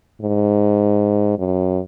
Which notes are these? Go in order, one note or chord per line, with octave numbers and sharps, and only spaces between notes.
G#2
F#2